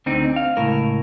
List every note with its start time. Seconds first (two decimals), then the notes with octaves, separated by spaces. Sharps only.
0.06 D2 D3 C4 D#4
0.36 F5
0.57 C#2 A2 A#4